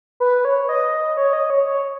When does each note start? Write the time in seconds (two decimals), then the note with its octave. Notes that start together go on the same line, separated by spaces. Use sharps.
0.20 B4
0.45 C#5
0.69 D#5
1.17 C#5
1.33 D#5
1.50 C#5
1.66 C#5